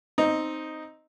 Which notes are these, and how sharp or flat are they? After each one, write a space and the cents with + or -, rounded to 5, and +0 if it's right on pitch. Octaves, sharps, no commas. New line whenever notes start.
C4 +0 D#4 +0